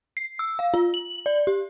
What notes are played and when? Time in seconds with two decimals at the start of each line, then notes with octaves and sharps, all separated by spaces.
0.17 C7
0.39 E6
0.59 F5
0.74 F4
0.94 F#7
1.26 D5
1.47 G4